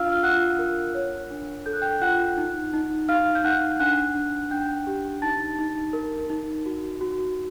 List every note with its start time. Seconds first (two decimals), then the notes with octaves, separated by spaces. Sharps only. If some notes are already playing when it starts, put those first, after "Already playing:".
Already playing: D4 F4 F5 E6 F6
0.12 F6
0.23 F4 F#5 F#6
0.59 A#4
0.94 C#5
1.30 D4
1.66 A4 G6
1.73 F#6
1.82 G5 G6
2.01 F4 F#5 F#6
2.37 D#4
2.74 D#4
3.08 D#4 F5 F6
3.35 G6
3.44 D#4 F#5 F#6
3.80 D4 F#5 F#6
4.15 D4
4.51 D4 G5 G6
4.87 G4
5.22 D#4 A5 A6
5.59 D#4
5.93 A#4
6.30 D#4
6.66 F#4
7.01 F#4